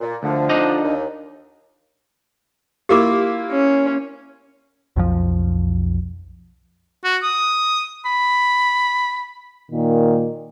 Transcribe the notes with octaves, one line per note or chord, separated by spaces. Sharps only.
A#2
D2 D3 F3
D4 D#4 D#5
D#2
A#3 E4 F4 G4 A#4 D6
C#4
B1 F2 F3
F#4
D#6
B5
A#2 D#3